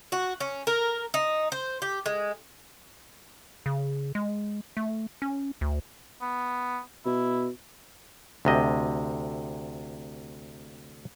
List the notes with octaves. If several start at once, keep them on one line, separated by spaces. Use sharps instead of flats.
F#4
C#4
A#4
D#4
C5
G4
G#3
C#3
G#3
A3
C#4
D2
B3
B2 E4
D2 C3 D#5